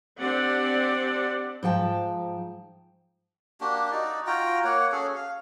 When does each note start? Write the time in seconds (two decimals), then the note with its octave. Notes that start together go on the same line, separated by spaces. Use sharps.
0.19 C4 D4 G4 D5 F#5
1.63 G#2 F3 G5 A5
3.61 A#3 D4 F#4 G4
3.92 D#4 F#4 D5
4.27 F4 F#4 G5 A#5
4.64 A#3 C#5 F#5
4.92 C#4 F#4 G#4 A4
5.15 F5